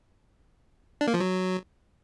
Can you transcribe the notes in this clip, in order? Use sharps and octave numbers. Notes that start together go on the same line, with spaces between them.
D4
A#3
F3
F#3